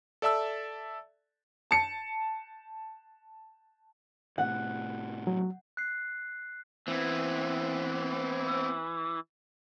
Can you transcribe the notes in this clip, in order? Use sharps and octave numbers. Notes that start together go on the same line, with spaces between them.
A4 D5 E5 A5 E6
A5 C#7
A2 C3 F#5
F#3
F#6 C7
E3 B3 C4